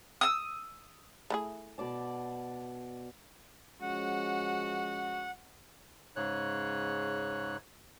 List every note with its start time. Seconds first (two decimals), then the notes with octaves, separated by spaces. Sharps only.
0.21 D#6 E6
1.30 A3 E4 G#4
1.78 B2 D5 A5
3.82 F3 G#3 C#4 F#4 F#5
6.16 G#2 C#3 C#5 F#6